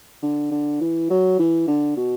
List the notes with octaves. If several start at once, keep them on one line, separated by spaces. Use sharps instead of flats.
D3
D3
E3
F#3
E3
D3
B2